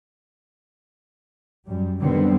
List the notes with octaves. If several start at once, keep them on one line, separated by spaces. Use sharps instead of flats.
F#2 G3
F#2 D3 D#3 G3 B3 C4